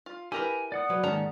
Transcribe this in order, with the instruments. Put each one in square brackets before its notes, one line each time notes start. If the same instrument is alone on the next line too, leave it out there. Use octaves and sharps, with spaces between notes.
[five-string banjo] F4
[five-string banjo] E4 A#4 B4 [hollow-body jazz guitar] G4 [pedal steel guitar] G#5
[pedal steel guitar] D5 F#5 D#6
[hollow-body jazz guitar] F#3 B4
[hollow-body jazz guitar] D#2 G#2 D#3 [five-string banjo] C#4 A5 A#5